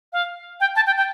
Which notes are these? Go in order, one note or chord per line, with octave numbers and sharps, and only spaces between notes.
F5
G5
A5
G5
G5